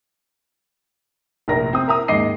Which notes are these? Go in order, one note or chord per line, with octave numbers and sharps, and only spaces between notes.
F1 A#1 A#4 A#6
C4 D#6
A#4 E5 A#5 D#6
D#2 G#2 D#5 D6 C7 D#7